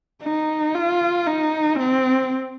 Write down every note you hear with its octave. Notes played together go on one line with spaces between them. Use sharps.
D#4
F4
D#4
C4